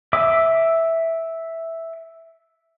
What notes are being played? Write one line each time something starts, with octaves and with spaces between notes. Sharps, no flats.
E5 D6